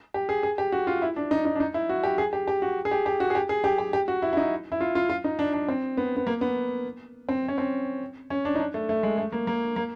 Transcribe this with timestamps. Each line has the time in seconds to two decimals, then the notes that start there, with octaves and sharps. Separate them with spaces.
0.14 G4
0.29 G#4
0.43 G#4
0.58 G4
0.72 F#4
0.87 F4
1.02 E4
1.16 D4
1.31 D#4
1.45 D#4
1.56 D4
1.60 D#4
1.74 E4
1.89 F#4
2.04 G4
2.18 G#4
2.33 G4
2.48 G4
2.62 F#4
2.85 G#4
2.91 G4
3.06 G4
3.20 F#4
3.30 G#4
3.35 G4
3.49 G#4
3.64 G4
3.78 G4
3.93 G4
4.08 F#4
4.22 E4
4.33 E4
4.37 D#4
4.72 E4
4.81 F4
4.95 F4
5.10 F4
5.24 D#4
5.39 D4
5.53 D4
5.68 C4
5.97 B3
6.17 B3
6.27 A#3
6.41 B3
7.29 C4
7.48 C#4
7.58 C4
8.30 C#4
8.45 D4
8.55 D#4
8.60 D4
8.74 A3
8.89 A3
9.03 G#3
9.18 A3
9.32 A#3
9.47 A#3
9.76 A#3